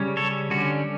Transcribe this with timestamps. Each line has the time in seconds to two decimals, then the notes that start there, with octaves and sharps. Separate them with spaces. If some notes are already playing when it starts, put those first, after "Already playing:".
Already playing: C#3 G3 C#4
0.17 A4 C#5
0.51 D3 G3 C#4 F#4